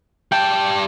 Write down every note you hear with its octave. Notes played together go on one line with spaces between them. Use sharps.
G3 G5 A5